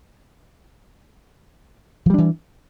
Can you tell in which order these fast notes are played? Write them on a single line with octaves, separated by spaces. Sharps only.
F3 G3 D4 E3